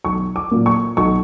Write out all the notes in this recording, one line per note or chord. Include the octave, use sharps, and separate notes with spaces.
B1 C#6
D6
A#2 F#3 A#3
C#6
B1 C#6